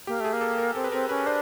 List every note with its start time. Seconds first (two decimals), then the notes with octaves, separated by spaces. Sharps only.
0.07 A#3 G4
0.20 A3 G#4
0.33 A#3
0.41 A4
0.58 A#4
0.75 C4 A4
0.84 B4
0.92 C4 A#4
1.09 C#4 B4
1.26 D4 C5